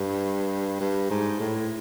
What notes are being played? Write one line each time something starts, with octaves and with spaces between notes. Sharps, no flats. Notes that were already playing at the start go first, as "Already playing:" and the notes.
Already playing: G2
G2
G#2
A2